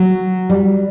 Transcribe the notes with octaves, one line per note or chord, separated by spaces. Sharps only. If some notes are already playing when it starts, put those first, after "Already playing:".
Already playing: F#3
G3